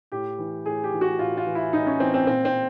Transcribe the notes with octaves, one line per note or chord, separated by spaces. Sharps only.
A2 G4
E3
A2 G#4
G4
E3
F#4
A2 F4
F4
E3
E4
A2 D#4
C#4
E3 C4
C4
A#2 C4
C4